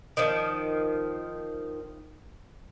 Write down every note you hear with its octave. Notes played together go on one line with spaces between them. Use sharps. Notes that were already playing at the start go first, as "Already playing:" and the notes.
D#3 F3